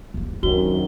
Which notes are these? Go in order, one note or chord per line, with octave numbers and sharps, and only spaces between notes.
D1 G1
F#2 C3 D#3 F#3 D4 F#4 G7